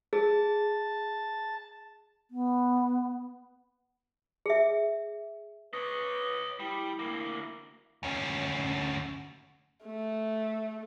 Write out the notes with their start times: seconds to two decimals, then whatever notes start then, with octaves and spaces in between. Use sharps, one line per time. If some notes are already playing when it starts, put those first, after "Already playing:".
0.13 G#4 A5
2.31 B3
4.46 G#4 E5
5.73 B4 C#5 D#5
6.60 G3 E4
6.99 D2 A#3
8.03 D2 C#4
9.85 A3